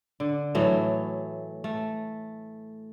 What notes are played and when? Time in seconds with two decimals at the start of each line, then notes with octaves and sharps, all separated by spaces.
0.20 D3
0.55 A2 E3 F#3 A3
1.64 A3